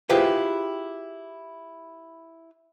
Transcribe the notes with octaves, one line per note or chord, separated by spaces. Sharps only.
E4 F4 G4 G#4 B4 C5